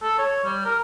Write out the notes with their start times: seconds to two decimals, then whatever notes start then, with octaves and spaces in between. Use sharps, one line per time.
0.02 A4
0.19 C#5
0.44 G3
0.65 A#4